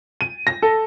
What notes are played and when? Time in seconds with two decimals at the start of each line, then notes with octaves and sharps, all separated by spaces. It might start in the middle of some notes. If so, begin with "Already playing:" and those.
0.21 D#7
0.47 A#6
0.62 A4